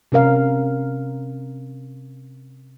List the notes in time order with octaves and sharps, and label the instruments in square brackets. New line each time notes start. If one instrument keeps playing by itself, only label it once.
[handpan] C3 C#4 A#4 F5